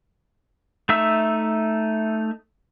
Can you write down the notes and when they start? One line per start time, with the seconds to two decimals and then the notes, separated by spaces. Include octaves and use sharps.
0.89 A3 D#4 E5 E6